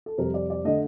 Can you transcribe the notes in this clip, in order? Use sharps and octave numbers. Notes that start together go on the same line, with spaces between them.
A4
F2 C3 G3 A#4
D5
D5
D3 A3 D#5